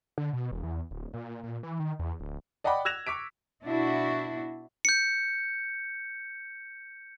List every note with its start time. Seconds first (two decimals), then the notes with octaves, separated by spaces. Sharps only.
0.18 D3
0.33 B2
0.51 E1
0.63 E2
0.91 D1
1.14 A#2
1.44 A#2
1.63 E3
1.80 D#3
1.99 E2
2.20 D1
2.64 D5 D#5 F#5 G5 B5 D6
2.85 E6 F#6 G#6 A#6 E7 F7
3.07 C#6 D6 B6 D7
3.62 B2 D4 E4 F#4
4.85 G6 C#7